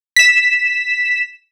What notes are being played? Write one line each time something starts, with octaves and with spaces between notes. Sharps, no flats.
B6 E7